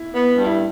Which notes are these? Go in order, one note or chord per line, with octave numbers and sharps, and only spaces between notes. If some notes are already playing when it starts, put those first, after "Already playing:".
Already playing: E4
B3
G2
E4